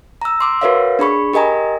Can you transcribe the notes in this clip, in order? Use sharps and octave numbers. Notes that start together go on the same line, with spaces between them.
A#5 E6
C6 D6 E6
F#4 A#4 B4 C#5 E5 F5
D4 G#4 B5 C#6
G4 A#4 D#5 G#5 A#5